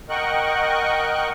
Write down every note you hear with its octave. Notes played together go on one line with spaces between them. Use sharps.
A#4 D#5 F#5 G5 C#6 F#6